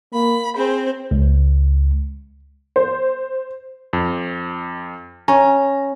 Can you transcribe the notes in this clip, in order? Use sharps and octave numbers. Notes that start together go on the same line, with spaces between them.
A#3 B5
C4 G#4 C5
C#2
C5
F2
C#4 A#5